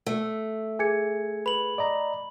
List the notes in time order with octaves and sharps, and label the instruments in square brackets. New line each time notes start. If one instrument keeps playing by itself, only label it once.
[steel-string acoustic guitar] A3
[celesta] G#4 G#6 C#7 [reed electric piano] G#5
[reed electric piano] B4 [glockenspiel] B5 F#7
[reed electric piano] D5 D#5 A#5